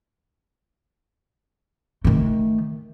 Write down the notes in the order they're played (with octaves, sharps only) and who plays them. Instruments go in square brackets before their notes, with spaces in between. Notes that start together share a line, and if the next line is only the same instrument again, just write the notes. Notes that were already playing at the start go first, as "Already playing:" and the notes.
[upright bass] D#3 A3